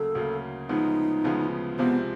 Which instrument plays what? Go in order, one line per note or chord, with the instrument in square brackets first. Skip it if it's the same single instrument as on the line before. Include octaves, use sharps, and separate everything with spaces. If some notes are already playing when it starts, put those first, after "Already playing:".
Already playing: [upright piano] D2 C#3 F#3 A#3 [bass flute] A4
[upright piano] D2 C#3 F#3 A#3
[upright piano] D2 C#3 F3 G#3 B3 [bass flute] D#4
[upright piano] D2 C#3 F3 G#3 B3
[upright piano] C2 C3 F3 G#3 C4 [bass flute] B3